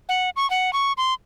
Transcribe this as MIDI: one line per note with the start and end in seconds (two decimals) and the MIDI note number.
0.09 0.30 78
0.36 0.48 85
0.50 0.73 78
0.73 0.93 85
0.98 1.14 84